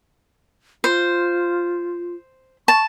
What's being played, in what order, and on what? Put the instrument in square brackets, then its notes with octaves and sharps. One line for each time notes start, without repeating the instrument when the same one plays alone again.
[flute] F4 [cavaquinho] C5
[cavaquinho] A5 [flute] C#6